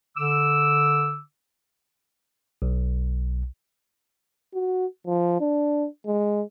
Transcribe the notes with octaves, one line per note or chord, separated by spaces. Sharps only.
D3 D6 E6
B1
F#4
F3
D4
G#3